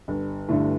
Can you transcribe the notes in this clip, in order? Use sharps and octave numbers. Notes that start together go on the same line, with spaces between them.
G1
G2 D3 A3 E4